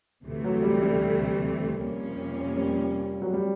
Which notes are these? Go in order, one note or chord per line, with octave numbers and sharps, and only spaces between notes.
D2 C3 E3 A3
F#3
G3
G3
F2 C3 F3 A#3 C#4
G3
F#3
G3